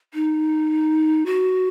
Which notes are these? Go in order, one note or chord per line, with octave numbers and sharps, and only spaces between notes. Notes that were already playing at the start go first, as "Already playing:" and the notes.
D#4
F#4